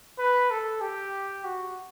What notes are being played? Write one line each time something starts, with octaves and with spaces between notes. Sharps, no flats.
B4
A4
G4
F#4